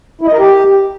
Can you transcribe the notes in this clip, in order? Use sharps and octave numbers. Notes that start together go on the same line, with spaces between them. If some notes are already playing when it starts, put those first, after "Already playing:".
E4
D#5
A#4
G4